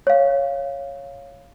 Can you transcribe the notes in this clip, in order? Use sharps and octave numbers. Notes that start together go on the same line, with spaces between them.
C#5 F5